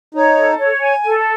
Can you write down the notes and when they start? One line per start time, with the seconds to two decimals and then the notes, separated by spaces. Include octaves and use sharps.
0.14 D#4 C#5
0.38 A4
0.59 C#5
0.81 G#5
1.04 A4